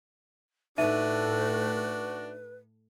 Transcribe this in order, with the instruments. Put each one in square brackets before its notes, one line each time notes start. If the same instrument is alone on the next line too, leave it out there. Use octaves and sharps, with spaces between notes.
[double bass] A2 A3 [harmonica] D4 F#4 [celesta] D#4 E5 D#7 [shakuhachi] B4